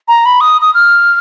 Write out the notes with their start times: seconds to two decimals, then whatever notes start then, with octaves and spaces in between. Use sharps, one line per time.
0.08 A#5
0.25 B5
0.41 D#6
0.61 D#6
0.74 F6